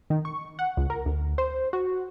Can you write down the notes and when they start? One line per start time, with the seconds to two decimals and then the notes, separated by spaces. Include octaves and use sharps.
0.10 D#3
0.25 C#6
0.59 F#5
0.77 C#2
0.90 A#4
1.06 D2
1.38 C5
1.73 F#4